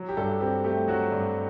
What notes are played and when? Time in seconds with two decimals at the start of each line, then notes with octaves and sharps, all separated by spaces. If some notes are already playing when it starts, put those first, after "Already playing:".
Already playing: F#3
0.09 G4
0.17 G2 A4
0.41 C4 G4
0.64 A3 G4
0.88 F#3 F#4
1.12 G2